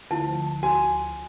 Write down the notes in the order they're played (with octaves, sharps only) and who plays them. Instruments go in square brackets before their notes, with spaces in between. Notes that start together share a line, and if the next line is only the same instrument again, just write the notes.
[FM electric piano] D2 F3 [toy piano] E4 A5
[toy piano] F#4 [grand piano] G#5